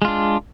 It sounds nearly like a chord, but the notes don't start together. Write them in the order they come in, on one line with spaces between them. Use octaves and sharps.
G#3 F4 D4